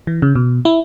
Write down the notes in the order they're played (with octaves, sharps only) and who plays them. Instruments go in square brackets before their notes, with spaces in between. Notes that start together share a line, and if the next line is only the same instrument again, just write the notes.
[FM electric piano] E3
C#3
B2
E4